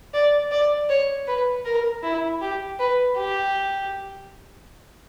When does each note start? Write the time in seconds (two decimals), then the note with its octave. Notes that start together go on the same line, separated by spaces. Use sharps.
0.14 D5
0.51 D5
0.89 C#5
1.28 B4
1.65 A#4
2.03 E4
2.41 G4
2.80 B4
3.17 G4